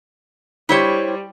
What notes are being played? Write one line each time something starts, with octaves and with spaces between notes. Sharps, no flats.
G3 E4 C5 C#5